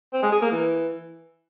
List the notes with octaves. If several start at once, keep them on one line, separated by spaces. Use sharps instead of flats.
C4
G#3
G#4
A#3
E3